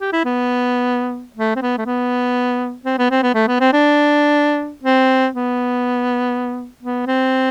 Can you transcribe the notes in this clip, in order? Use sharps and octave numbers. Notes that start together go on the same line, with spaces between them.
G4
E4
B3
A3
C4
B3
A3
B3
C4
B3
C4
B3
A3
B3
C4
D4
C4
B3
B3
C4